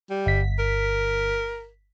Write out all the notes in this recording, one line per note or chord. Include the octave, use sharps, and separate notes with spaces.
G3
G1 B6
A#4